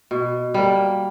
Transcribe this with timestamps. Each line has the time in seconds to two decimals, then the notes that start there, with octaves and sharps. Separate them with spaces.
0.11 B2
0.54 G3 A#3